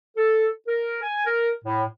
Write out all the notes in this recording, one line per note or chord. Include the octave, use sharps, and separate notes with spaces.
A4
A#4
G#5
A#4
A2